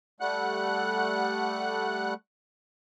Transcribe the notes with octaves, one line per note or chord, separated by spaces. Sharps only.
G3 A3 F#5 F#6